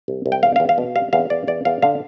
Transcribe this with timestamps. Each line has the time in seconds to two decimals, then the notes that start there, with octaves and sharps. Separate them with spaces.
0.08 C2
0.26 C2
0.32 G5
0.43 E2 F5
0.56 F5
0.60 E2
0.69 F5
0.78 B2
0.95 G3 F5
1.13 E2 F5
1.30 E2 D5
1.47 E2 D5
1.65 E2 F5
1.82 D3 F5